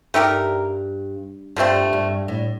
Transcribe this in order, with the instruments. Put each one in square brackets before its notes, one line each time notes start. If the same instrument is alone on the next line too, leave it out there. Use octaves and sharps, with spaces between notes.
[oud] G2 [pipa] A3 D#4 G4 A#4
[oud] G2 [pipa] D3 F3 A3 C4
[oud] G2
A2